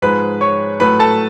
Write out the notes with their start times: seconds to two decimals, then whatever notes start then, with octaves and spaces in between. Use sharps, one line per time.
0.02 G#2 F3 G#3 B4 B5
0.41 C#5 C#6
0.80 A2 F#3 A3 B4 B5
0.99 A4 A5